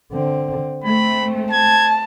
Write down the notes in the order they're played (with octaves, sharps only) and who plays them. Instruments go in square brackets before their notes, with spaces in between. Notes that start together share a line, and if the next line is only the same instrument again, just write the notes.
[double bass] D3 C4
[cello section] A3 [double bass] C4 [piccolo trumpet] B5
[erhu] A5 [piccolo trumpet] G#6